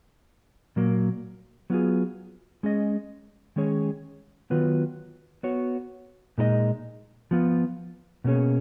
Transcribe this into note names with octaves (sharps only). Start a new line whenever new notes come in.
A#2 F#3 A#3
F#3 B3 F4 G#4
G#3 C#4 G#4 D#5
D#3 G#3 C#4 G#4 C#5
D#3 F#3 B3 F4 B4
B3 F#4 C#5
A#2 G#3 D#4 A#4 D#5
F3 B3 F4
B2 A#3 C#4 G#4 C#5